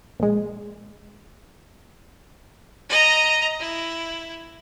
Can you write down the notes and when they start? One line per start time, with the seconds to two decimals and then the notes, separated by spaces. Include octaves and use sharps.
0.20 A#1 G#3
2.89 D#5 A#5
3.59 E4